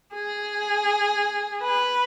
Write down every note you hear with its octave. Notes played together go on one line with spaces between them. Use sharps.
G#4
B4